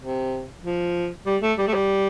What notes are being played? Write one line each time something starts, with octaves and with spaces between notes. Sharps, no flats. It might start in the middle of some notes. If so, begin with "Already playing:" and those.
C3
F3
G3
A3
G3
A3
G3